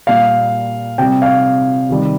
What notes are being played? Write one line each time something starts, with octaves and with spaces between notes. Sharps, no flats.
A#2 G3 F5
C3 G3 G5
F5
C3 D#3 G3